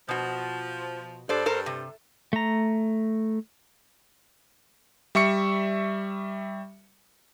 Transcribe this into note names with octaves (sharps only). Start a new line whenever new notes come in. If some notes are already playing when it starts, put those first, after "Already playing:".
B2 F3 F#4
G2 A4 C5 D5
A4 A#4 C5
C3
A3 A#5
G3 E5 C#6 C#7